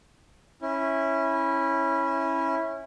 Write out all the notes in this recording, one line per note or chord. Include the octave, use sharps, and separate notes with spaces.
C#4 E4